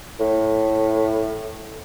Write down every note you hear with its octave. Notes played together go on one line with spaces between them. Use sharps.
A2